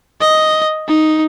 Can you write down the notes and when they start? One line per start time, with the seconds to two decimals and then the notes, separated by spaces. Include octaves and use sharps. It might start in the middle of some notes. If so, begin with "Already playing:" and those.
0.21 D#5
0.88 D#4